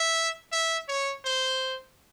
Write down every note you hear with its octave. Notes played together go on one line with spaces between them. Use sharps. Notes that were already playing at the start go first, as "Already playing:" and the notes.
Already playing: E5
E5
C#5
C5